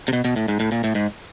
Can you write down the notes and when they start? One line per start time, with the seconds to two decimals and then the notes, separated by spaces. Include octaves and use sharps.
0.08 C3
0.13 B2
0.25 B2
0.36 A2
0.48 G#2
0.60 A2
0.72 A#2
0.84 A2
0.95 G#2